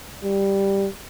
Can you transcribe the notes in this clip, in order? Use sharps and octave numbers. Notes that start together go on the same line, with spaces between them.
G3